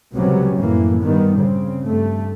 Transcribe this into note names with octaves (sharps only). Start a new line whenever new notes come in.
C#2 C3 F#3 G3 B3 C#4
F#2 A2 E3 A#3
G2 D#3 G3 B3
C#3 C4
G2 A3